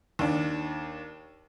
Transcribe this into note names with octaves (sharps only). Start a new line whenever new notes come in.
D#2 D4